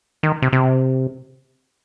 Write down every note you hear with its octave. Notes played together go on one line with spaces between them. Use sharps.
D#3
C3
C3